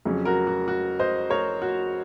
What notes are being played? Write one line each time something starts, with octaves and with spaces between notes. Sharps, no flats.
F2 C#3 F#3 C#4
F#4 A#4
F#4
F#4
C5 D#5
A#4 C#5
F#4